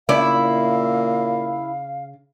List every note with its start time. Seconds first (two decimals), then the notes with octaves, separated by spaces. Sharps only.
0.09 A#2 C#3 E4 D5 F5